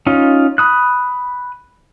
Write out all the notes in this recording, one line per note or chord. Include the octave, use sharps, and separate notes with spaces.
C#4 D#4 F4
B5 D#6 F#6